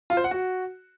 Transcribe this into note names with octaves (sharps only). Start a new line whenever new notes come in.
F4
C5
F#5
F#4